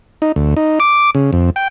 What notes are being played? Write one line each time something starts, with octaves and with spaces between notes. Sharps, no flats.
D#4
D2
D#4
D6
C#3
F2
G5